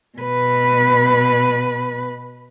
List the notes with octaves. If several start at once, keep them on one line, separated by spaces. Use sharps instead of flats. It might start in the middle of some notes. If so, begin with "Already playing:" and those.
B2 B4